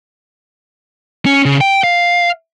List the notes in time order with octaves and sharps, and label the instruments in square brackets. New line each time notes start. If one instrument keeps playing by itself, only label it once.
[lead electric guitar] C#4
C#3
G5
F5